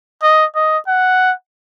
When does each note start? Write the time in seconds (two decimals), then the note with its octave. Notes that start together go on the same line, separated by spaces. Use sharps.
0.23 D#5
0.55 D#5
0.88 F#5